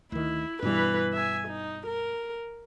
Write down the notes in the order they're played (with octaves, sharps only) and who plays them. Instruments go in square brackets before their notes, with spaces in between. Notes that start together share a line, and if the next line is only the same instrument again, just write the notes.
[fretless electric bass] D2 D#3 [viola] E4
[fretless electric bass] G2 B2 G3 [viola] E3 B4
[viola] E5 G#5
D#4
A#4